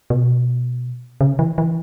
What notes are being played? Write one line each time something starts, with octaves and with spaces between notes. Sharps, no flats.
B2
C#3
E3
E3